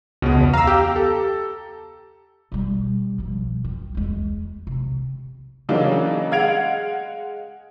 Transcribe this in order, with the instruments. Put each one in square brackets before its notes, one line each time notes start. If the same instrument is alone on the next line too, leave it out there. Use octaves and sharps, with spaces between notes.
[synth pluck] C#2 [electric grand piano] B2 B3
[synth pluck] E2
[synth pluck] F5 E6 [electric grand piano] A#5
[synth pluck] G4
[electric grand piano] A4
[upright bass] B2 G3
B2 F3
C4
E2 G#3
C3
[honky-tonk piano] C#3 E3 F#3 A#3 D4 D#4
G#3 F5 F#5 G#6 D7 F7